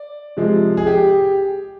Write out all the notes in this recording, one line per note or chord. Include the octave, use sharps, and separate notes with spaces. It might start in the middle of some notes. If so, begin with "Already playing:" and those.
Already playing: D5
C3 F3 G#3
G#4
G4